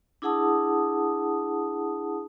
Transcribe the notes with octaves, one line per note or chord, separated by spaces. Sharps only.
D4 E4 G#4 F#5 A5 D#6